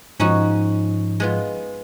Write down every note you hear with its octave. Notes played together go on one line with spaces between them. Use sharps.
G#2 F3 C#4 D#4 F#4
G#3 B3 F4